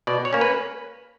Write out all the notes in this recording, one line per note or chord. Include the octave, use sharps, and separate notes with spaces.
B2 D5
C#5
A#3 C#4
B4